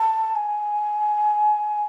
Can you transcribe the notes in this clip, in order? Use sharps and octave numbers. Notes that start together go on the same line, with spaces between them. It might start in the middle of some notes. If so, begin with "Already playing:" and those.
Already playing: A5
G#5